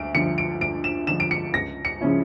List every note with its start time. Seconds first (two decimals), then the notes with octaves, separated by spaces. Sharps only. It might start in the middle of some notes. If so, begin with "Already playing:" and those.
Already playing: D2 D7
0.15 D3 F3 C#7
0.38 D7
0.61 D2 D7
0.84 E7
1.07 D3 F3 E7
1.20 D7
1.31 C#7
1.54 C#2 A#6
1.85 C#7
2.01 C#3 F3 C#4 E4